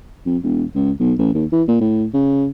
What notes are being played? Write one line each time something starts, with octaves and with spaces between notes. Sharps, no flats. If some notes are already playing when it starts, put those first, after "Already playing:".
F2
E1
C#2
B1
A1
D#2
E3
A#2
A2
C#3